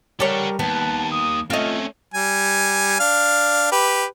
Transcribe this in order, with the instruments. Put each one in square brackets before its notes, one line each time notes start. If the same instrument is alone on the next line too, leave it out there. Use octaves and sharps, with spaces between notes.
[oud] G3 C#5 [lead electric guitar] A4 F#5 [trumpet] A#4
[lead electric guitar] D#2 [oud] B3 [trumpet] A5
[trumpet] D#6
[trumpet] A3 [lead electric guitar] C4 C#4 [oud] F4 D#5
[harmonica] G3 G#5
D4 F5
G4 B4